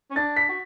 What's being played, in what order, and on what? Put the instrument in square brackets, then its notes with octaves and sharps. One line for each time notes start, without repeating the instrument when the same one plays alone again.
[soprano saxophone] C#4
[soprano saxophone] D4 [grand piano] A6
[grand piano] B6
[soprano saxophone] F#4